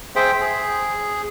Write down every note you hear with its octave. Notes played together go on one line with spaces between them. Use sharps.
G#4 C5 E5 G5
G#4